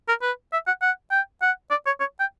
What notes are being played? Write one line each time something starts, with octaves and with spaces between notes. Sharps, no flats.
A#4
B4
E5
F#5
F#5
G5
F#5
D5
C#5
C#5
G5